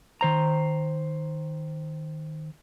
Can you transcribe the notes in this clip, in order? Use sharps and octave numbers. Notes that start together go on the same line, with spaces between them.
D#3 C5 A#5